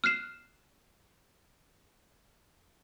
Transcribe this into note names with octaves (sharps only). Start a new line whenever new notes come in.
F6 F#6 C7 E7